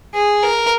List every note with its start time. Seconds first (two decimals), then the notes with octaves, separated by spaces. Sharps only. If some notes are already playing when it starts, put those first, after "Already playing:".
0.14 G#4
0.43 A#4